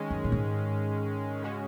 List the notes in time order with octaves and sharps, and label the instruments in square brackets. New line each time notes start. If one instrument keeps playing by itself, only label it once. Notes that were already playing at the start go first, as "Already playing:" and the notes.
Already playing: [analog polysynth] D#3 G#3 C#4
[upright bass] F#2
A#2
G#2
[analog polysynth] C#3 G#3 C#4 F#4